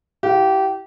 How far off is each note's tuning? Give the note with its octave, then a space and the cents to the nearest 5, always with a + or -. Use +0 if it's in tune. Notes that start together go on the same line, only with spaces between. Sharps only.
E4 +0 G4 -25 F5 +0